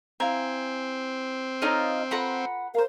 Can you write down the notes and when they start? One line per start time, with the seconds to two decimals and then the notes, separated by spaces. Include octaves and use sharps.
0.20 C4 E4 F5 G#5 A#5
1.62 D#4 F4 A4 C#5 D#5 A#5
2.11 F4 A4 B4 F#5 A#5 B5
2.75 A#4 C5 F5